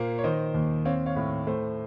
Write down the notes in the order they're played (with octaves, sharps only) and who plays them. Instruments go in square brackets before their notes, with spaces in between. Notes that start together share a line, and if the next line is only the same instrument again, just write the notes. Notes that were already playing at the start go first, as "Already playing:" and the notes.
Already playing: [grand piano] A#2 A#3 C5
C#5
D#3 C5 D#5
D#2
C4 C#5 F5
C#5 F5
A2
A3 C5